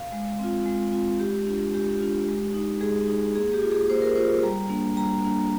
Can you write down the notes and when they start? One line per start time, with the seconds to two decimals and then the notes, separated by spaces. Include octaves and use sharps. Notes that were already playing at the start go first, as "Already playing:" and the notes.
Already playing: F5
0.12 G#3
0.39 C4 F4
0.66 G#3
0.93 C4 F4
1.19 G#3 G4
1.47 D4 F4
1.73 G#3 G4
2.00 D4 F4
2.27 G#3
2.54 D#4
2.81 G#3 G#4
3.08 D#4
3.35 A#3 G#4
3.54 G4
3.62 F4
3.71 G#4
3.89 A#3 C5
4.02 A#4
4.16 F4 C5
4.43 G3 A#5
4.69 A#3 D4
4.96 G3 A#5
5.25 A#3 D4